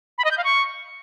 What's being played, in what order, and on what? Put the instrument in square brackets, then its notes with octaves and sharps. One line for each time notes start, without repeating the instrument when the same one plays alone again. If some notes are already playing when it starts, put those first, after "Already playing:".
[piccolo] B5
D#5
G6
F5
C#6